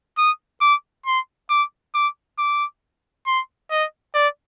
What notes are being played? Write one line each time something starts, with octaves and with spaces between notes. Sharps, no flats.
D#6
D6
C6
D6
D6
D6
C6
D#5
D5